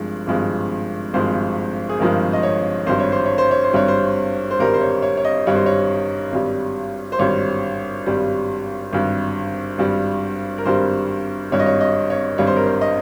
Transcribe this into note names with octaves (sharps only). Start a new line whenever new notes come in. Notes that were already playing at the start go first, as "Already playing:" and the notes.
Already playing: G#1 G2 F3 G#3
G#1 G2 F3 G#3
G#1 G2 F3 G#3 C5
G#4
G#1 G2 F3 G#3 A#4
D#5
C#5
G#1 G2 G3 C5
C#5
C5
C#5
C5
C#5
C5
G#1 G2 G3 C#5
C5
C5
G#1 G2 G3 A#4
C5
C#5
C#5
C#5
D#5
G#1 G2 G3 C#5
C5
C#5
G#1 G2 G3
C5
G#1 G2 G3 C#5
G#1 G2 G3
G#1 G2 G3
G#1 G2 G3
A#4
G#1 G2 G3 C5
G#1 G2 G3 C#5
D#5
C#5
D#5
C#5
G#1 G2 G3 C#5
C5
A#4
C5
D#5